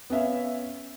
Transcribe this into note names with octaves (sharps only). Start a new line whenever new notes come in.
B3 C#4 E5 F5